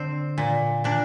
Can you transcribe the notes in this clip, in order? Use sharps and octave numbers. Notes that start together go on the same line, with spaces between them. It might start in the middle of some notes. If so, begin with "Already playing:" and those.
Already playing: D3 C4
A#2
A#2 D4